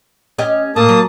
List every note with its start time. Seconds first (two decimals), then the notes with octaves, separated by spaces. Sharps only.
0.39 C#4 G4 D#5
0.76 A2 A#3 A5 D#6
0.89 F#3